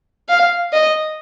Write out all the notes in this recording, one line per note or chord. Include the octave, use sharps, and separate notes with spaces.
F5
D#5